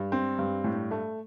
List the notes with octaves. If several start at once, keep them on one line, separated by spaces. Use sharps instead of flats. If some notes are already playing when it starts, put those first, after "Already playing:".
Already playing: G2
C4
G2
A2
A3